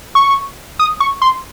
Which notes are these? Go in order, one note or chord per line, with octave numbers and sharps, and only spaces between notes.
C#6
D#6
C#6
C6